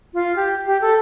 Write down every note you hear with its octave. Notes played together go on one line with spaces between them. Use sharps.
F4
G4
G4
A4